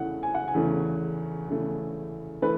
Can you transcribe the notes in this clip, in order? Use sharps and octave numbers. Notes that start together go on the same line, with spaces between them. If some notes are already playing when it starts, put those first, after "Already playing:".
Already playing: E2 C#3 E3 A3 F#5
G#5
F#5
G#5
E2 C#3 E3 A3
E2 C#3 E3 A3
E3 A3 B4